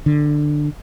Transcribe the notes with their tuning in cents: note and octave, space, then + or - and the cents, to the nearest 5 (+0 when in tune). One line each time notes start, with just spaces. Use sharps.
D3 +15